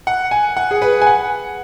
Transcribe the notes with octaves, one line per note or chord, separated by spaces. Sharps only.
F#5
G#5
F#5
G#4
B4
G#5
F#5